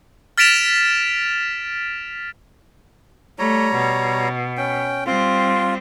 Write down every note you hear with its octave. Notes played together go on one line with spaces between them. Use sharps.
F6 A6 B6 D7 E7 F7
G3 A3 C#5 A#5
B2
C#4 G5
G3 C4 F4